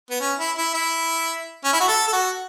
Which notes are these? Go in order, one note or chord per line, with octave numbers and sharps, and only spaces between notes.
B3
C#4
E4
E4
E4
C#4
E4
F#4
A4
A4
F#4